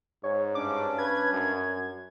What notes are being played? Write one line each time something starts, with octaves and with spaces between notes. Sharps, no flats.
G#2 C#5
G2 C#4 D4 D6
B4 G#6
F#2